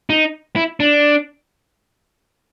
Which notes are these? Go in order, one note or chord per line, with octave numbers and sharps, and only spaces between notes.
D#4
E4
D4